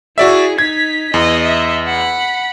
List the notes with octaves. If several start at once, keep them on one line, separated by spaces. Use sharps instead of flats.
E4 F#4 G#4 D5 E5
D#4 G#6 B6
E2 D#5
D#5 E5
F#5 B5